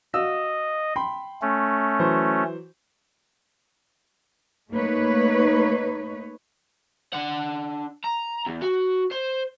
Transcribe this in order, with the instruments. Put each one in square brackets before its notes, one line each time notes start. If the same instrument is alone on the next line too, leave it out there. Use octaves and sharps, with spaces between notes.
[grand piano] F#4 F5 E6 [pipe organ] D#5
[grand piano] G5 B5 C6
[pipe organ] A3 C#4
[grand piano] E3 F#3 C5
[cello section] A3 A#3 D#4 B4 C#5
[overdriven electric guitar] D4 F#5
A#5
E2
F#4
C5